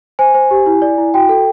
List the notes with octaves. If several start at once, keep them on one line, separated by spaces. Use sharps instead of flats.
C5 G#5
C5
G4
E4
D5
E4
F#4 G5
A4